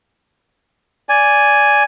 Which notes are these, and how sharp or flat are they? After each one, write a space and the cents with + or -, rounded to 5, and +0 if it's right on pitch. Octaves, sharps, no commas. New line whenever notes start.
D5 -15 G#5 +0